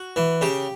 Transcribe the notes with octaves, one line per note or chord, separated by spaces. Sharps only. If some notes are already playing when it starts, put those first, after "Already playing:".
Already playing: F#4
E3
C#3 G4